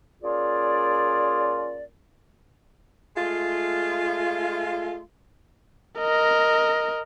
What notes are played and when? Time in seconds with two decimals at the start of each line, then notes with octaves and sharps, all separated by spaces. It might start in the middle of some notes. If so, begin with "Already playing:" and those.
0.23 A#3 C#4 F4 G#4 D5
3.16 G#3 A3 F4
5.99 A#4 D#5